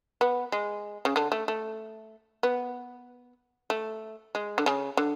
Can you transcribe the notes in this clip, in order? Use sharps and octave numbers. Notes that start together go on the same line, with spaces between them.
B3
G#3
C#3
D3
A3
A3
B3
A3
G#3
D3
C#3
D3